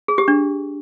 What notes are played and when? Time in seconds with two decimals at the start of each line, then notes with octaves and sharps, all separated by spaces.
0.08 G#4
0.18 G4
0.28 D4